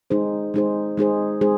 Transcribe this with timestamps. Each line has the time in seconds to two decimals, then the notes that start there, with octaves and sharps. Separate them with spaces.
0.10 G#3 D#4 G#4 C5
0.54 G#3 D#4 G#4 C5
0.97 G#3 D#4 G#4 C5
1.41 G#3 D#4 G#4 C5